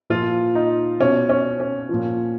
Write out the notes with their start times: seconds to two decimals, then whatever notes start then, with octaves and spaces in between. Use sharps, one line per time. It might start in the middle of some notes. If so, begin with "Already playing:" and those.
0.10 A#2 F3 F4
0.55 D#4
1.00 B2 C#4
1.29 C#4
1.60 C#4
1.89 A#2 F3